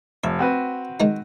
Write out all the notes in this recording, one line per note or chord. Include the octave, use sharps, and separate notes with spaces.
F1 E5
C4 F#4 B4
D#3 G#3 D#4